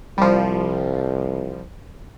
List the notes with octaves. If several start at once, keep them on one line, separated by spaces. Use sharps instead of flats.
C2 F3 G3